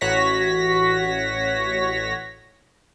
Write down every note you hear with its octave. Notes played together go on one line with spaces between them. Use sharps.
A1 F#4 C#5 A#6 B6